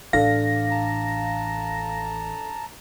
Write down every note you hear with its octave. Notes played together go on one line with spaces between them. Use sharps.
A1 D4 A4 F5 A#6
A5 A#5